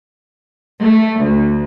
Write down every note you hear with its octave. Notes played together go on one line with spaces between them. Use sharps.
A3
D2